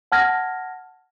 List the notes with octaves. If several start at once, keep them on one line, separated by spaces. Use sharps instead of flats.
F#5 A5 F6 G#6 A#6